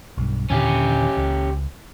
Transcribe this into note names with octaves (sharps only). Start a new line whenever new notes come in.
B1 G2
D#2 A#2 D3 C#4 G4
C#2